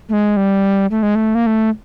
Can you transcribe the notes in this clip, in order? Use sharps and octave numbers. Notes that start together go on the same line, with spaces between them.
A3
G#3
G3
A3
G#3
A3
A#3
A3